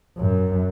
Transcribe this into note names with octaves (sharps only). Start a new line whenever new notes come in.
F#2